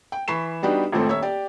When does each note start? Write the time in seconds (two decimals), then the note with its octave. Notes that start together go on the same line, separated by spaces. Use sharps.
0.12 G5
0.28 E3 B5 C#6 B6 C7 E7
0.63 G3 B3 D4 D#4 F#4 G4
0.92 G#1 F2 A2 A3 C4 A4
1.08 D#1 C#5 E5 E6
1.22 G4 D5